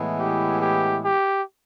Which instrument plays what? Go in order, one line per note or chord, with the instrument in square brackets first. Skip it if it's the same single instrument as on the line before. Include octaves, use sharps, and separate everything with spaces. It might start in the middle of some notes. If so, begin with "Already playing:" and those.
Already playing: [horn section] A2 E3 G#3 B3 E4
[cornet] G4
G4
G4